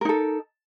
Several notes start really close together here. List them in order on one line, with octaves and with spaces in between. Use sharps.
A#4 D#4 A4